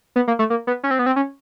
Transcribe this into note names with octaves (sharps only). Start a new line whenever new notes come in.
B3
A#3
A3
A#3
B3
C#4
C4
B3
C4
C#4